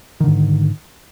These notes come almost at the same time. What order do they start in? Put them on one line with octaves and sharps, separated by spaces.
D#3 D3 G#2